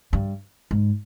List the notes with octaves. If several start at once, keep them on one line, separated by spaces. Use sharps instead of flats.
G2
G#2